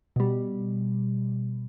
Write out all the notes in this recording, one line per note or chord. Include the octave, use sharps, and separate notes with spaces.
B2 G3